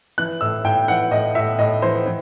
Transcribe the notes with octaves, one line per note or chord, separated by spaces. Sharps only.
E3 F#6
A2 E6
A2 G5
E3 F#5
A2 D#5
A2 E5
A2 D#5
E3 C5
E3